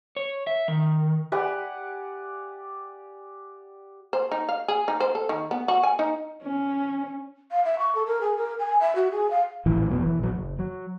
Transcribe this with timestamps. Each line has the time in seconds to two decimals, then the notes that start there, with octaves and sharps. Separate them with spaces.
0.16 C#5
0.47 E5
0.68 D#3
1.32 G4 D5 F#5 G#5
4.13 C5
4.31 D#4
4.49 F5
4.68 G#4
4.88 D#4
5.00 C5
5.15 A4
5.29 D#3
5.51 B3
5.68 F#4
5.83 G#5
5.99 D#4
6.43 C#4
7.51 F5
7.65 E5
7.78 C#6
7.95 A4
8.06 A#4
8.21 G#4
8.36 A#4
8.59 G#5
8.80 E5
8.95 F#4
9.11 G#4
9.30 F5
9.66 A#1 A2 E3 F3
9.90 F1 B2 F#3
10.02 E3
10.19 A#1 F#3
10.35 F#1
10.59 F#3